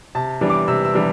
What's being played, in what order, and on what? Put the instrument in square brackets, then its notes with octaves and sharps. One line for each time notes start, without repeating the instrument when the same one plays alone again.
[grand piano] C3 A5
E3 G3 B3 D4
D6
C3 E6
E6
E3 G3 B3 D4